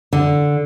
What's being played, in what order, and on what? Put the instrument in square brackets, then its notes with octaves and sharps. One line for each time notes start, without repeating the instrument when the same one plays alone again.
[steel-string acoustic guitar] D3